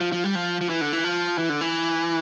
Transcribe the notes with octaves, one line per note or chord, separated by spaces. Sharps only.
F3
F3
G3
F3
F3
E3
D3
E3
F3
E3
D3
E3